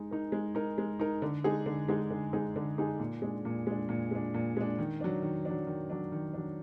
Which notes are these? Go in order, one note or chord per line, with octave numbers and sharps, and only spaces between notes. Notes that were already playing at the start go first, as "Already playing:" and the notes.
Already playing: G#3 D#4
D#4 A#4
G#3
D#4 A#4
G#3
D#4 A#4
D3
G#3 D#4 G#4
D3
G#3 D#4 G#4
D3
G#3 D#4 G#4
D3
G#3 D#4 G#4
A#2
G#3 D4
A#2
G#3 D4
A#2
G#3 D4
A#2
G#3 D4
D#3
F#3 D4
D#3
F#3 D4
D#3
F#3 D4
D#3
F#3 D4